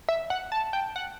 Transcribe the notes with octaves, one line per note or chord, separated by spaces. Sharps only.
E5
F#5
A5
G5
F#5